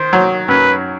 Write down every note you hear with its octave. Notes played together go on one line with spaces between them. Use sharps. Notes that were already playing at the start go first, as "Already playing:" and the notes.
Already playing: D#3 C5
F#3
F#2 B4